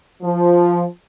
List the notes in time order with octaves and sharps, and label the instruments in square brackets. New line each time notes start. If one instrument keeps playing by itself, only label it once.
[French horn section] F3